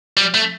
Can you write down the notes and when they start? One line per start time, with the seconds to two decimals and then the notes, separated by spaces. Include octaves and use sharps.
0.17 G3
0.34 A3